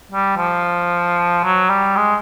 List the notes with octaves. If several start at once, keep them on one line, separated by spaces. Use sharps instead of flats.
G3
F3
F#3
G3
G#3